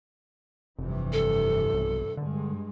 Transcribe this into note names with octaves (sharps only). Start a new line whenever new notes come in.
F1 G2 C3 E3
A4
B1
G2 D3 G#3